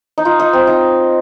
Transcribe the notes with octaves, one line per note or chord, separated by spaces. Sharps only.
D#4
F4
D#4
C4
D#4